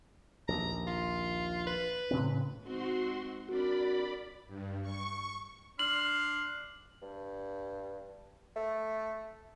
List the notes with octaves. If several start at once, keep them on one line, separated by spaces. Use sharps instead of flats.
A#1 D#2 A#5
F4
B4
A2 C#3 C4
G#3 C4 D#4 F#4 C6
C4 D4 F#4 A#4 D5 B5
G2
C#6
D4 C6 F6 F#7
G2
A3